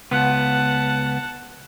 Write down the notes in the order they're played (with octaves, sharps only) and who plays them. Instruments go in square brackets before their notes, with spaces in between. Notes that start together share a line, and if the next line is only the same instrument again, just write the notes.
[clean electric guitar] C#2 B3 [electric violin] F#5 A5